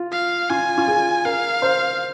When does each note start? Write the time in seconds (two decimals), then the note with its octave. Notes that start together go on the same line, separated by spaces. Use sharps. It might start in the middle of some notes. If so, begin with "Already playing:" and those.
Already playing: F4
0.12 F5
0.49 F4 G#5
0.78 F4
0.88 G#4
1.25 A#4 F5
1.62 C5